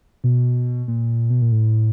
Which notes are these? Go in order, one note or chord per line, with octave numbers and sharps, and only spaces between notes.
B2
A#2
B2
A#2
A2